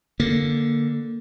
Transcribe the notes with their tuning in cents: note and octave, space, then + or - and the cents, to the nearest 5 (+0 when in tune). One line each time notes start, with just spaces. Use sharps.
D3 +0 A#3 +0